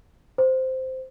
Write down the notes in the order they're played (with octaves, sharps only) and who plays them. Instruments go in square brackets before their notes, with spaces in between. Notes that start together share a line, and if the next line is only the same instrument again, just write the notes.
[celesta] C5